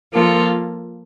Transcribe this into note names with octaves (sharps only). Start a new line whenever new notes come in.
F3 A#3 F4 A4